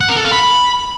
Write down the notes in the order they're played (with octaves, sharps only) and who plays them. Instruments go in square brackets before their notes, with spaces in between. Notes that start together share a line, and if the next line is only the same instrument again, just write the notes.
[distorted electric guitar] F#5
A#4
A4
F5
B5